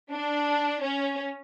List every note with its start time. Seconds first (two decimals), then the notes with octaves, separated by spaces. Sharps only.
0.12 D4
0.83 C#4